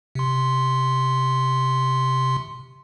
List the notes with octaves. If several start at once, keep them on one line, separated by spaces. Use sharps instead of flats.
C3 C6